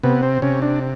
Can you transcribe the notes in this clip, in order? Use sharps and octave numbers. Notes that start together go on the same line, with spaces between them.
C3 B3
C4
C3 C#4
D4